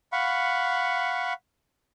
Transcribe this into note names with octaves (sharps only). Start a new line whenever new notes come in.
F5 F#5 B5 C#6